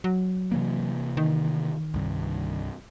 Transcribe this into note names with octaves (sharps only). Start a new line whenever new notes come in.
F#3
C3 E3 A#3
D#3
C2 G2